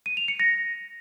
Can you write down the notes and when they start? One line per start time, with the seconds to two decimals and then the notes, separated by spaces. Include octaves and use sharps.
0.06 D#7
0.17 F7
0.28 C#7
0.40 A#6